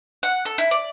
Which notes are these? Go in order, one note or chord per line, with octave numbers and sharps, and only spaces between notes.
F#5
A4
E4
D5